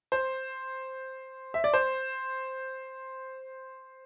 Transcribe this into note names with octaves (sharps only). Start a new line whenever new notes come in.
C5
E5
D5
C5